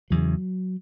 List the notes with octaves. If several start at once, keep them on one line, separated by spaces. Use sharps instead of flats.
E2 C#3 F#3